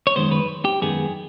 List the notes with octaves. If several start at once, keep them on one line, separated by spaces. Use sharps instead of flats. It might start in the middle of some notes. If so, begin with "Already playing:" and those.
C#5
F#2 D#3 G#3 B3 C5
B4
G4
F#2 D#3 G#3 B3 G#4